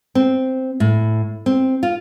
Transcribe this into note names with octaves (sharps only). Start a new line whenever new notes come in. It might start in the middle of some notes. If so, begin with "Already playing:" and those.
C4
A2
C4
F4